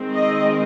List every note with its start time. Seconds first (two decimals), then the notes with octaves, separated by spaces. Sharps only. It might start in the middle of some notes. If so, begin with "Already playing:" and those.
Already playing: D#3 G#3 C4
0.14 D#5